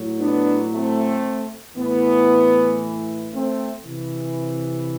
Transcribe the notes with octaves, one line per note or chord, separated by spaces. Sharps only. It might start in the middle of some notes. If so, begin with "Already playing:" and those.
Already playing: A2 F#3
B3 D4
A3 C4
A2 E3 B3
A3 C4
C3 E3